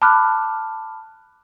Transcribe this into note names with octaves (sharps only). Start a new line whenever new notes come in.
A5 B5 D6 F6 F#6